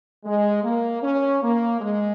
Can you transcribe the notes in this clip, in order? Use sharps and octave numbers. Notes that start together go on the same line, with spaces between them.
G#3
A#3
C#4
A#3
G#3